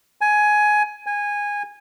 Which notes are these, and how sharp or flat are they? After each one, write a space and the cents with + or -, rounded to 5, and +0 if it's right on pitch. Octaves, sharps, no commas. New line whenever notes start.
G#5 +15
G#5 -15